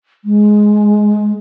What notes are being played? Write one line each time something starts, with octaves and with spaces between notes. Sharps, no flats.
G#3